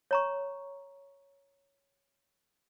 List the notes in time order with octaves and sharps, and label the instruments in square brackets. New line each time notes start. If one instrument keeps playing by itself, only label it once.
[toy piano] C#5 A#5 C#6